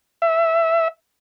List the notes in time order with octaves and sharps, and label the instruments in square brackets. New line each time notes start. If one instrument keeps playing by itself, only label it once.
[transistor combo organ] E5